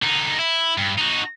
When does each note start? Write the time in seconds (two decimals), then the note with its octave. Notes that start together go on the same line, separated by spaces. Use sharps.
0.02 D3 D#4
0.39 E4
0.78 G2
0.98 D#4 F#4